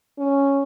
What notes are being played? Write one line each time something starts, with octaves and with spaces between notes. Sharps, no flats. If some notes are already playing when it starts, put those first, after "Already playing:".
C#4